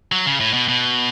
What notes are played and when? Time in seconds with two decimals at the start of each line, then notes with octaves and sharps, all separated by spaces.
0.12 F#3
0.26 C#3
0.40 A2
0.53 B2
0.68 B2